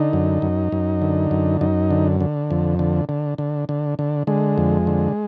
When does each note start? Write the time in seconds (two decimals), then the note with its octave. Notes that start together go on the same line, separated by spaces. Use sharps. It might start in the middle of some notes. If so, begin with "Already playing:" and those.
Already playing: D3 D#4
0.13 F#2
0.42 F#2
0.72 F#2
1.02 D3
1.31 F#2
1.61 F#2 D#4
1.91 D3
2.21 D3
2.51 F2
2.79 D3
3.09 D3
3.38 D3
3.69 D3
3.99 D3
4.27 D3 G#3
4.58 F2
4.87 D3